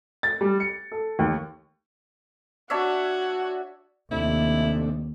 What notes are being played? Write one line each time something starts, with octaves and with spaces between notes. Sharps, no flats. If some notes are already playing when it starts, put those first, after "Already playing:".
A6
G3
C#7
A4
D#2
D4 F#4 C#5 E5
D#2 C3 A3 D4 E4